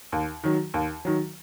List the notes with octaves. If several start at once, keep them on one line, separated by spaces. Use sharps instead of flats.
D#2
D#3 F#3
D#2
D#3 F#3